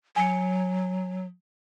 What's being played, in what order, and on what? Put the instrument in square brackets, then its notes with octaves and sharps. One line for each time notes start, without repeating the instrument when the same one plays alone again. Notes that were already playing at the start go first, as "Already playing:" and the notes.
[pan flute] F#3 [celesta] G#5 C#7